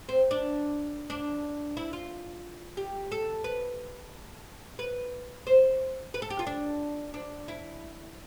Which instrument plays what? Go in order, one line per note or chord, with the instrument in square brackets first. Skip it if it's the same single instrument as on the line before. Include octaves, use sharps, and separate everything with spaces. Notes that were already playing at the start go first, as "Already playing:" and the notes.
[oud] C4
D4
D4
E4
F4
G4
A4
B4
B4
C5
B4
A4
G4
F4
D4
D4
E4